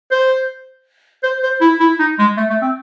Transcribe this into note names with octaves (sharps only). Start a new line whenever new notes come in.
C5
C5
C5
E4
E4
D#4
G#3
A3
A3
C4